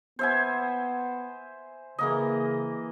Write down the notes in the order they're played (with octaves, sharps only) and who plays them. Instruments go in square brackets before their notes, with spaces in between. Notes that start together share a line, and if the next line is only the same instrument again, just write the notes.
[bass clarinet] B3 [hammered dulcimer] C5 E5 G#5
[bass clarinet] C#3 [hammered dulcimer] E3 A#3 D#5